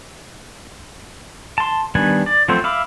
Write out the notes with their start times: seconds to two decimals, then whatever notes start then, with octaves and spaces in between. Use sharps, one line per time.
1.58 A5 C6
1.95 D#3 G3 B3 D4 G#5
2.26 D5
2.48 F3 F#3 A3 C4 C5
2.64 E5 F5 B5 D6